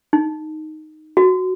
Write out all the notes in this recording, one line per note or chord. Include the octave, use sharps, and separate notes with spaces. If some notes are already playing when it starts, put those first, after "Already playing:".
D#4
F#4